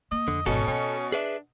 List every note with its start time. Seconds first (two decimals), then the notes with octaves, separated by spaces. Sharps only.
0.11 A#3 D#5
0.28 F2 D3
0.46 G#1 B2 D3 C#4 A4
0.67 B3 C#4
1.12 D4 G#4 B4 E5